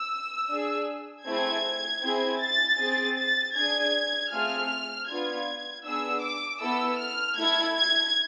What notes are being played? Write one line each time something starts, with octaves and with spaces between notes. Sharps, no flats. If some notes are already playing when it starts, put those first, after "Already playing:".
Already playing: E6
D4 G#4
A3 C4 E4 G#4 G#6
C4 E4 G#4
A6
C4 G#4
A6
D4 G#4 G#6
A3 C4 F4 G#4 F6
B3 D4 F4 G#6
B3 D4 G#4 E6
D6
B3 E4 A4 E6
F6
A3 E4 A4 G#6
G#6